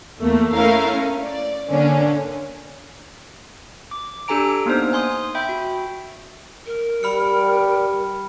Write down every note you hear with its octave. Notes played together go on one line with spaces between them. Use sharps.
E2 A3 A#3
A3 C#4 E4 A#4 F5
C#4
D5
D3 A#3 C#4 D4
D6
D4 G4 A4 G#5 A#5 D7
A#3 B3 D4 D#4 C5
G#5 C6 D#6
E5 G5 B5 G6
F#4
A#4
G3 B5 F6 C#7